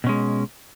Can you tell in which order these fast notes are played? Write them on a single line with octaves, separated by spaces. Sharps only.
B2 C#4 G#3